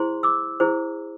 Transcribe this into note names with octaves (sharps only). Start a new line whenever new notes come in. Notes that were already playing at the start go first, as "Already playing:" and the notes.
Already playing: E4 G#4 C5 C6
D6 E6
E4 G#4 C5